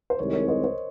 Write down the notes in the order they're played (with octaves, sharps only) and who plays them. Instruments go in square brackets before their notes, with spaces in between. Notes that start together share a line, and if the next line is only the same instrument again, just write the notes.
[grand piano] C5
[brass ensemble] C2 C3 D#3 G#3 [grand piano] A#4 C#5
[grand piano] A#4 C#5
C5 D#5
C5